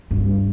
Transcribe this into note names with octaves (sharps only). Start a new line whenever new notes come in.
G2